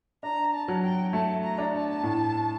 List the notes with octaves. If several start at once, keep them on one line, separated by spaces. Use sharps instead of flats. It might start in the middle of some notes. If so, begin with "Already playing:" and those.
D4 A#5
A5
F#3
G5
A3 A5
A#5
D4
A5
A2